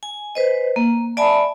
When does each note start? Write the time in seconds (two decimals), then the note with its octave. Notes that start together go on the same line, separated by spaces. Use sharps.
0.03 G#5
0.35 B4 C5 D#5
0.76 A#3
1.17 D5 E5 G#5 A5 B5